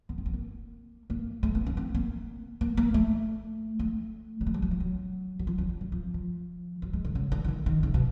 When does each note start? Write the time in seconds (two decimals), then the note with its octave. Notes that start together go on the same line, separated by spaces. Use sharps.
0.09 B3
0.18 C4
0.26 B3
0.34 A#3
1.10 A#3
1.43 A3
1.55 B3
1.66 C#4
1.77 C4
1.94 A#3
2.61 A#3
2.77 A#3
2.94 A3
3.79 A3
4.41 G3
4.47 G#3
4.54 G3
4.62 F#3
4.71 F3
4.80 F#3
5.39 F#3
5.47 F3
5.58 F#3
5.69 G3
5.81 F#3
5.92 F3
6.14 F3
6.82 F#3
6.93 G#3
7.05 D3
7.15 C#3
7.32 D3
7.44 E3
7.48 D#3
7.66 D#3
7.83 C#3
7.94 B2